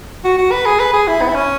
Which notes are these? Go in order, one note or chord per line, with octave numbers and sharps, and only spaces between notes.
F#4
F#4
B4
G#4
B4
G#4
E4
B3
E4
C#4